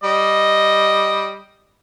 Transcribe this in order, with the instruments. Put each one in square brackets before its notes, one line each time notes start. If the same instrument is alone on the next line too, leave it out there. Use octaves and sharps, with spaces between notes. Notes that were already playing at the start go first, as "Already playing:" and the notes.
[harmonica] G3 D#5